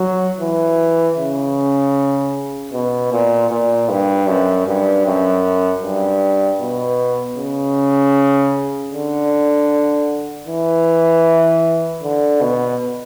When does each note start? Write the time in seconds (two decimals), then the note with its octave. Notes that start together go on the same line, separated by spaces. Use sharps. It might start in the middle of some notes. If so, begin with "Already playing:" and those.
Already playing: F#3
0.41 E3
1.18 C#3
2.72 B2
3.12 A#2
3.51 A#2
3.89 G2
4.27 F#2
4.66 G2
5.06 F#2
5.83 G2
6.60 B2
7.38 C#3
8.93 D3
10.48 E3
12.03 D3
12.41 B2